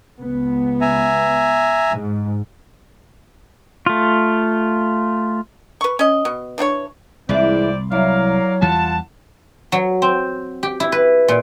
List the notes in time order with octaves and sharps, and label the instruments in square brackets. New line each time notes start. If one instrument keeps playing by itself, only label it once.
[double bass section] C#2 B3
[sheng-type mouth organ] E5 G#5 A#5
[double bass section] G#2
[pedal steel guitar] A3 F4
[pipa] B4 C#6
C#4 D#5
B2
E3 D4 F#4 C#5
[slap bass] C2 [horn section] A#2 C4 D5 [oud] E3 G#3 E4
[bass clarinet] F#3 [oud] E4 [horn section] A#4 D5 F5
[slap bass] E2 E3 G3 [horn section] F4 F#5 A5
[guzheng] F#3
C4
G4
E4
B4
A#2